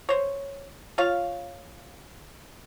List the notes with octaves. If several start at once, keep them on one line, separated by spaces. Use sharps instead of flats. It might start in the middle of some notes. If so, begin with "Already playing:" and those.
C5 C#5
F4 C#5 F5